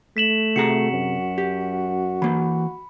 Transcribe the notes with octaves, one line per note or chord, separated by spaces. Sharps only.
A3 B6 E7 F#7
C3 F#4 G#4 A#5 C#7
F#2
G4
E3 A#3 B5